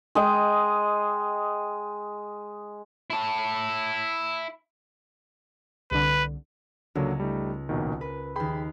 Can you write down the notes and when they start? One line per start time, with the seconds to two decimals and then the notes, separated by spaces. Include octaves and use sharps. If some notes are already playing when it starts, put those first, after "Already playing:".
0.15 G#3 D#5 G5
3.10 E4 A5
5.91 C2 D3 B4
6.95 C#2 D3 F#3 A#3
7.20 G3 A3 D#4
7.69 A#1 B2 D#3
8.01 A#4 B4
8.36 D#2 G#4 G5 B5 C6